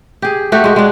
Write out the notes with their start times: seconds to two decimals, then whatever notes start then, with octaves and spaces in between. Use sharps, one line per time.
0.22 G4 G#4
0.52 A3 F#4 G4
0.64 G#3 F#4
0.76 G#3 D4